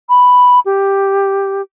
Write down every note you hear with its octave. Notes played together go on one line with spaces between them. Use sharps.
B5
G4